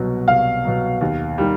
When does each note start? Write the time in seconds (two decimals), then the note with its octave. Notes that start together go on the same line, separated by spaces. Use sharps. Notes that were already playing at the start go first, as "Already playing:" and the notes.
Already playing: C2 B2 F#3
0.28 C2 F5
0.65 B2 F#3
1.01 D#2
1.38 D#3 G3